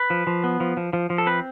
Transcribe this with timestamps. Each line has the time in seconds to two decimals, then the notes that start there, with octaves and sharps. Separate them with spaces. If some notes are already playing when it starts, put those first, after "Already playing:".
Already playing: B4
0.10 F3
0.27 F3
0.44 B3
0.60 F3
0.77 F3
0.93 F3
1.10 F3
1.18 A4
1.26 C4 B4